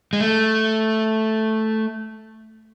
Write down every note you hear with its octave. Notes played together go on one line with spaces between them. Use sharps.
G#3
A3